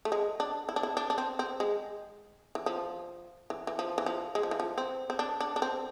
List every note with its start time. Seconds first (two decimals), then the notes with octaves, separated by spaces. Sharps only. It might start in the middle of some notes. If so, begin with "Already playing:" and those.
0.05 A3
0.12 G#3
0.40 D4
0.69 E4
0.76 D4
0.83 E4
0.97 D4
1.10 D4
1.18 C4
1.39 C4
1.60 G#3
2.55 E3
2.66 F3
3.50 E3
3.67 E3
3.79 F3
3.98 E3
4.06 F3
4.35 G#3
4.43 F3
4.51 E3
4.60 F3
4.78 C4
5.10 C4
5.19 D4
5.40 D4
5.56 D4
5.62 C4